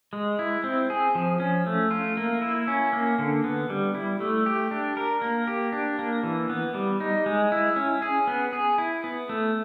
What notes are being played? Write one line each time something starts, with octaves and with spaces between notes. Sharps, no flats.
G#3
E4
C4
G#4
F3
C#4
A3
F4
A#3
E4
C#4
A#3
D3
B3
G3
E4
A3
G4
D4
A#4
A#3
G4
D4
A#3
E3
B3
G3
D#4
G#3
E4
C#4
G#4
B3
G#4
E4
B3
A3